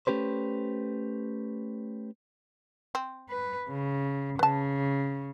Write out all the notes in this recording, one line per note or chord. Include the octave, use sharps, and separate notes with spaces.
A3 C#4 G4 B4 C5
C4
B4
C#3
C#3 B4 A5